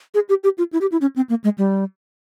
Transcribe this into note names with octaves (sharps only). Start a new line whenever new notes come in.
G#4
G4
G4
F4
E4
G4
E4
C#4
C4
A#3
G#3
G3